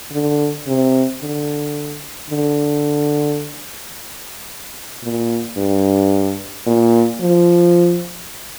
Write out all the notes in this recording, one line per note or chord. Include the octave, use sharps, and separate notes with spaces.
D3
C3
D3
D3
A#2
G2
A#2
F3